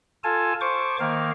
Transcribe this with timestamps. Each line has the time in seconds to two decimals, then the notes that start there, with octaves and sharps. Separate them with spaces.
0.24 F4 A4 G#5 A5
0.61 C5 C#6 D6
1.00 D#3 A#3 F5